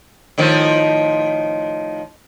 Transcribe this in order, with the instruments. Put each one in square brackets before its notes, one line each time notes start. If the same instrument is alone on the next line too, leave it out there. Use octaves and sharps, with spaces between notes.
[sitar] A2 D#3 F3